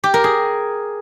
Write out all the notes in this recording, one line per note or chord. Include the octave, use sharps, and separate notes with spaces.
G4
A#4
G#4